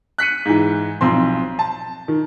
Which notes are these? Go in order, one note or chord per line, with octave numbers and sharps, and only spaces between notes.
F#6 B6 C#7 D#7
G#2 E3
B1 F3 C4 C6
A5
D#3